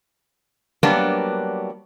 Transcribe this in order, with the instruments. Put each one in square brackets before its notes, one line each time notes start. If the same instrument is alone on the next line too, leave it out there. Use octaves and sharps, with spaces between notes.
[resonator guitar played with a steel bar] F#3 G3 A#3 B3 D4 F#4